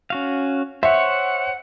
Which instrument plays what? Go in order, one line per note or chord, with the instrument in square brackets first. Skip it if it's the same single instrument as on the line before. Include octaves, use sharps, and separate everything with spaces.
[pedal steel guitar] C#4 F#4 F5
[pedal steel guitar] C5 C#5 [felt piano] E5 [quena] F#5